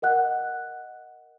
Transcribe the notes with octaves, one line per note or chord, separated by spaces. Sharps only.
A#4 D#5 F#5 F#6